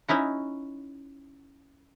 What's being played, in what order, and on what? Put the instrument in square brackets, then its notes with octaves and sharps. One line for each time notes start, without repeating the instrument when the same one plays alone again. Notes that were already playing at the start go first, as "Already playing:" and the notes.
[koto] C#4 D#4 E4 F#4